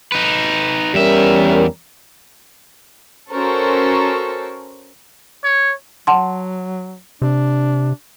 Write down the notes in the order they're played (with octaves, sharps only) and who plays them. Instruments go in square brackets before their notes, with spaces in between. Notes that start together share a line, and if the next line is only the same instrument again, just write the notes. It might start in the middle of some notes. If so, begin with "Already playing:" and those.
[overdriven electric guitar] D#4 B4
[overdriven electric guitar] E2 E5 [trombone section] G3 C#4 A#4
[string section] C#4 F#4 A4 A#4 C5 C#6
[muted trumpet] C#5
[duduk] F#3 [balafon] F#5 A5 C6
[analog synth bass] C3 [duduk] D4